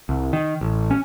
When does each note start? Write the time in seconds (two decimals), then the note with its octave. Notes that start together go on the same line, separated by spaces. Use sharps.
0.09 C2
0.33 D#3
0.61 A1
0.91 C#4